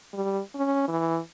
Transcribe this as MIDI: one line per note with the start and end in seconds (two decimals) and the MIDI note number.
0.13 0.40 55
0.55 0.85 61
0.88 1.20 52